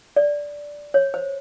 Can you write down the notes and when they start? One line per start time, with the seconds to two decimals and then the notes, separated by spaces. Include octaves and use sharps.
0.16 D5
0.94 C#5
1.14 C5